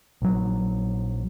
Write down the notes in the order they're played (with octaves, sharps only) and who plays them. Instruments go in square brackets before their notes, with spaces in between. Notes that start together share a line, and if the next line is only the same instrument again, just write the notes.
[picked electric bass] A#1 F#3